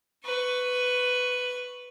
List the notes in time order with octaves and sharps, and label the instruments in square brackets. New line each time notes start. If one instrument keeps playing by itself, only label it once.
[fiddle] B4 C#6